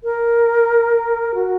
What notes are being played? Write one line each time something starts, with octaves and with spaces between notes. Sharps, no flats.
A#4
F#4